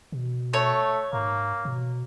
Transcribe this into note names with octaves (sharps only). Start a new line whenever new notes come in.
B2
A3 C#5
G#2 A#3
B2